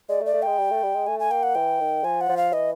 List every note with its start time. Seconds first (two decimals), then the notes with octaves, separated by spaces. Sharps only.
0.09 G#3 D5
0.21 A3
0.26 D5
0.34 A3
0.42 G#3 G5
0.58 G3
0.71 A3
0.83 G3
0.95 G#3
1.07 A3 G#5
1.20 G#5
1.31 A#3 G5
1.43 F#5
1.55 E3 G5
1.80 D#3
2.04 F3 G#5
2.21 F#5
2.29 F3
2.37 F5
2.53 E3 D#5